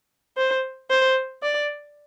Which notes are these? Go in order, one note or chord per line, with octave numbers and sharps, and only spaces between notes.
C5
C5
D5